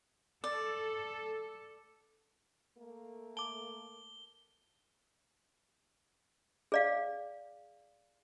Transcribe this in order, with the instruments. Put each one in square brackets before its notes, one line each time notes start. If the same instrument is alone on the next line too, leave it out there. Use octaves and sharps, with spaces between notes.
[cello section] A4 [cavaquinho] D5
[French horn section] A3 A#3
[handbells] A5 D6 [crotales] G7
[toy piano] G#4 D5 F5